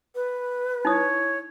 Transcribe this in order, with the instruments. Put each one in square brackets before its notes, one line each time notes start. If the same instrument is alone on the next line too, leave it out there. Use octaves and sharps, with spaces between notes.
[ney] B4
[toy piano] D#4 E4 D#6 [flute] C#5